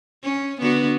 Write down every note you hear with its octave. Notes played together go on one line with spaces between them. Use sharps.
C#4
D3 B3 F#4